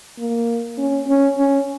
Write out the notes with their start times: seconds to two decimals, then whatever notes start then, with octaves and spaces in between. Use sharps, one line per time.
0.19 A#3
0.78 C#4
1.08 C#4
1.38 C#4